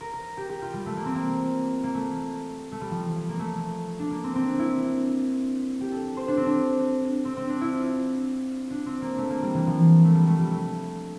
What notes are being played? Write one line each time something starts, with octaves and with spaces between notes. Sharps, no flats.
A#4
A#4
G4
G4
F4
G3
A3
A#3
C4
A#3
A#3
A3
A3
G3
F3
A#3
A3
D4
A#3
C4
C4
D4
E4
G4
A4
C5
D4
C4
D4
C4
C4
D4
E4
F4
D4
C4
A#3
A3
A#3
G3
E3
F3
A3
G3
A3
G3
A3